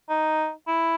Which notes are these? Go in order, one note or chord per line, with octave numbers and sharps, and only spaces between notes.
D#4
E4